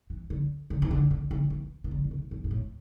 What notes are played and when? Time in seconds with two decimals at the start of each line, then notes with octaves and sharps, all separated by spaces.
0.10 E3
0.30 D3
0.70 D3
0.82 E3
0.91 D3
1.11 D3
1.31 D3
1.50 E3
1.84 E3
1.91 D3
2.04 D3
2.11 C3
2.31 G2
2.44 G2
2.51 A2